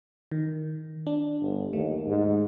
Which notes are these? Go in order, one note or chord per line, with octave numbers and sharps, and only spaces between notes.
D#3
D4
G1
D#2 A3
G#2